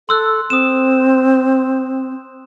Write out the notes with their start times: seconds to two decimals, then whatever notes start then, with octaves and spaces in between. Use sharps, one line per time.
0.09 A4 C6 E6 F#6
0.50 C4 D#6 E7